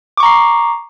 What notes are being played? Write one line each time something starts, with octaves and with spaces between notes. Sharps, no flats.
A#5 C#6 D6 C7